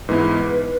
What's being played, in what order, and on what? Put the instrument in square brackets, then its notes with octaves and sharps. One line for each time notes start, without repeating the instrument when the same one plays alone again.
[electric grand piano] G#2 E3 B3 E4 [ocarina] B4